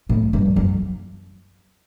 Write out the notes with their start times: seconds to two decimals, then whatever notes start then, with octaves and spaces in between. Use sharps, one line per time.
0.09 A2
0.33 G2
0.56 F#2